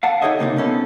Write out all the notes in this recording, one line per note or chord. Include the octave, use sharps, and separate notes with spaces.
F5 F#5 A5
D#4 G4 A4 C#5 D#5 E5
C#2 C3 A#3 D#4
G2 B2 C#4 A4